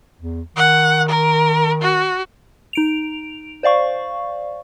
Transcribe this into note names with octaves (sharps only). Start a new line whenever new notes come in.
E2
D#3 F#5
A#4
F#4
D#4 D7 F7
C5 D5 F5 C#6